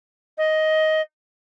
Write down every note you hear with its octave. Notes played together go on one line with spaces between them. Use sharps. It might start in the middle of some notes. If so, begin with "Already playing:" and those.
D#5